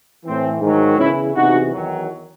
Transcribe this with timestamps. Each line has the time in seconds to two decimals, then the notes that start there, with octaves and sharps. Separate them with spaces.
0.25 A2 E3 C4
0.61 G#2 D#3 F#3
0.98 E2 C#3 E3 C#4 E4
1.35 E2 C3 E3 D#4 F#4
1.72 E2 D#3 F#3